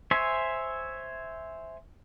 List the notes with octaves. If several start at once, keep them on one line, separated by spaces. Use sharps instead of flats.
C5 C#5 E5 G#5